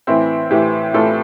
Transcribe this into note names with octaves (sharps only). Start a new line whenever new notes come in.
A2 E3 C4 E4
A2 E3 E4 G4
A2 E3 F4 A4